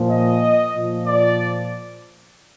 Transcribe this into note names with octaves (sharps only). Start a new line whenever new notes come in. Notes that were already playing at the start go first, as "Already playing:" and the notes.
Already playing: A#2 F3
D#5
A#2 F3
D5